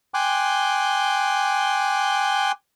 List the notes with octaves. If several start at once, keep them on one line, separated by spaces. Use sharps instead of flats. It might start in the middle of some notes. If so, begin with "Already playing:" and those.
G5 G#5 C6 D6 F#6